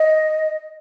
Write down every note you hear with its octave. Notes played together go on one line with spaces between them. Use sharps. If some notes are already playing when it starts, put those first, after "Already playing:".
Already playing: D#5